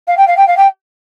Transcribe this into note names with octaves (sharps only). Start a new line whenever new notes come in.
F5
G5
F5
G5
F5
G5